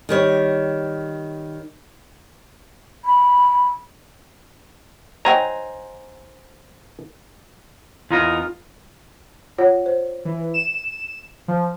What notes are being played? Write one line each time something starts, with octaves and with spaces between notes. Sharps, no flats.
D#3 G3 C#5
B5
F#3 D#4 C5 G5 G#5 A#5
E2 D#4 F4 A#4
F4 C#5 F#5
C5
E3
E7
F3